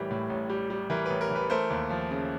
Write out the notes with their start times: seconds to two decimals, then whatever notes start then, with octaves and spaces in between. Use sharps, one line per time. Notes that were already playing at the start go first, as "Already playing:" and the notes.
Already playing: A1 A2 E3 G3 A#4 B4 C#5
0.11 A2
0.30 A1
0.50 G3
0.70 G3
0.90 E3 A#4
1.06 A1 B4
1.21 A#4
1.31 E3
1.36 B4
1.50 A3 A#4 C5
1.70 D#2
1.90 F3
2.11 C#3